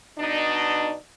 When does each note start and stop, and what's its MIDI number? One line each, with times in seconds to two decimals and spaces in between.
0.19 0.94 47
0.19 0.94 62
0.19 0.94 63